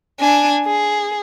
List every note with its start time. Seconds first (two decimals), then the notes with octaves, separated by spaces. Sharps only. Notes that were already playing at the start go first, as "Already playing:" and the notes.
0.20 D4 G#5
0.65 G#4